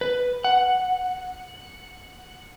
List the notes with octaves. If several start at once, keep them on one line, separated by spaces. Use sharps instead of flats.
B4
F#5